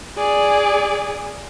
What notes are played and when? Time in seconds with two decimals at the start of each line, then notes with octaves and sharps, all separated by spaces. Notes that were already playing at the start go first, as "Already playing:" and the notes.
0.17 G#4 D5